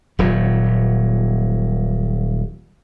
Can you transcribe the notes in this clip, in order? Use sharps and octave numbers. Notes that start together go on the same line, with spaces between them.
D#1 A#2 F#3